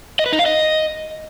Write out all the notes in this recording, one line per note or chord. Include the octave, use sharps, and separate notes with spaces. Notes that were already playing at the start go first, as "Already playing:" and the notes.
D#5
B4
D#4
F5
D#5